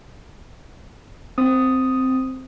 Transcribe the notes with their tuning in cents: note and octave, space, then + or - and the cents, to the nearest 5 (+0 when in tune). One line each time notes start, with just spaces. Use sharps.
C4 -5 D#6 +0